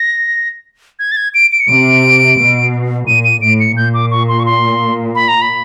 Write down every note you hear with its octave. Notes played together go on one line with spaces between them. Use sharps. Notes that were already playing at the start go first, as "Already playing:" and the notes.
Already playing: A#6
G#6
A6
G#6
D7
D7
C#7
C3 D7
B2
A#2 D#7
D#7
A2 D7
C#7
A#2 G6
D6
C#6
C6
C#6
C6
B5
A#5
B5